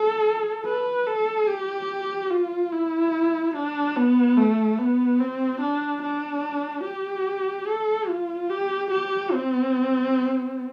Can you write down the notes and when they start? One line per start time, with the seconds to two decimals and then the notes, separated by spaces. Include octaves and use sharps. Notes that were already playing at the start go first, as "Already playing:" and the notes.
Already playing: A4
0.65 B4
1.07 A4
1.48 G4
2.30 F4
2.72 E4
3.54 D4
3.96 B3
4.36 A3
4.78 B3
5.20 C4
5.61 D4
6.02 D4
6.84 G4
7.67 A4
8.09 F4
8.49 G4
8.91 G4
9.32 C4